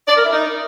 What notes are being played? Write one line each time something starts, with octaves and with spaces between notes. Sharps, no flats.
D5
A#4
E4
D#4